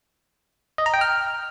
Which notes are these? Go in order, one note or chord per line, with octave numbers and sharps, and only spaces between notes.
D#5
A#5
G5
F6